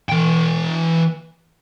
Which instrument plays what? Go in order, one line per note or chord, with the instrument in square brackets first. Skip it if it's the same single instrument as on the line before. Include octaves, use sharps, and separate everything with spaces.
[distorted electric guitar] E3 G5